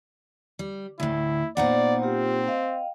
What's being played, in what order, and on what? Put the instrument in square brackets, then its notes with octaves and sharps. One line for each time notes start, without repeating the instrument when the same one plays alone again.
[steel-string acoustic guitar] G3
[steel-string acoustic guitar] D2 A2 [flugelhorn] E4
[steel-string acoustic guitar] A#2 D#4 F#5 [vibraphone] B3 C5 [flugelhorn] D5
[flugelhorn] C4 [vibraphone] F4 G4
[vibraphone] D#5 F5 G5